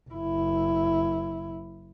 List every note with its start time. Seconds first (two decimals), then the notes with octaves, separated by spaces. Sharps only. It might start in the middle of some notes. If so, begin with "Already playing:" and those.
0.10 F#1 E4